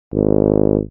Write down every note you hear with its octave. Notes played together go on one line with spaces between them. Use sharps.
G#1